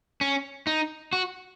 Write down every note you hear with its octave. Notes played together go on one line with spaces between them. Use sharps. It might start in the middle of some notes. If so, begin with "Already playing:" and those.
C#4
D#4
F#4